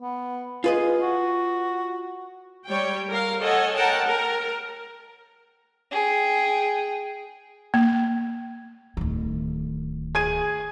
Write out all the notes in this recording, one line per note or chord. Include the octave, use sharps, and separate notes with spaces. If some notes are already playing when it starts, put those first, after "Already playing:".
B3
F4 G#4 B4 D#5
F#4
G3 C#5 G5
A#4 F5
A4 C#5 D#5 F#5 G#5
A#4 F#5 G5 A5
A#4
G#4 G5
A#3
D1 D#3
G#4 G#6 D#7